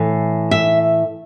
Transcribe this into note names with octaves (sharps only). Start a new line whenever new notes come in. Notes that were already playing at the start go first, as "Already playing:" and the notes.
Already playing: A2 E3
E5